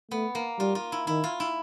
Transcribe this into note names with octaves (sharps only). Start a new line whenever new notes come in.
A3 B3
A#3
G3 F4
F4
E4
D#3 E4
F4
E4